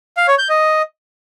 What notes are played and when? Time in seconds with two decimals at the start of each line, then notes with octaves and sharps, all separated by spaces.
0.17 F5
0.28 C#5
0.39 G6
0.49 D#5